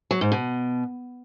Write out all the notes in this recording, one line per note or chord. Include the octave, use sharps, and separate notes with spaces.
F#3
G#2
B2